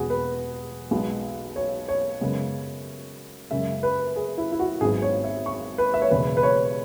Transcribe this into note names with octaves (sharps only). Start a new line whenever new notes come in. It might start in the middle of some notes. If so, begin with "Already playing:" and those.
Already playing: E1 E2 B2 B3 F#4 G#4
B4
B1 B2 G#3 B3
C#5
C#5
F#2 C#3 G#3 B3
F#2 C#3 G#3 E5
B4
G#4
E4
E4
F#4
G#1 G#2 F#3 B3 G#4
C#5
E5
C#6
B4
E5
C#5
E1 E2 C#3 B4
B4
C#5